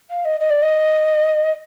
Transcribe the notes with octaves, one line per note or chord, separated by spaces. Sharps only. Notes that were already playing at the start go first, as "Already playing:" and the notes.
F5
D#5
D#5
D5
D#5